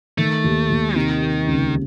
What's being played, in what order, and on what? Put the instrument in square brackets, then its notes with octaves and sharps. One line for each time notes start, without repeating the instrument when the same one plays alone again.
[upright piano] D#3 [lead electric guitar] A3
[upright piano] D#2
D#2
[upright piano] C3 [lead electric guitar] D#3
[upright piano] A#3
C#2